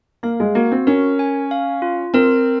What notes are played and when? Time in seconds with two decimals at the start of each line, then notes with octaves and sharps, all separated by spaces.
0.23 A#3 F5
0.40 G#3
0.55 A#3 F#4
0.72 C4
0.87 C#4 A#4
1.19 G#5
1.51 F5
1.82 F4
2.14 C4 A#4